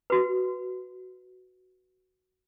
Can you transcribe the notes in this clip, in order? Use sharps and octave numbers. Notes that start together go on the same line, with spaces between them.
F#4 B4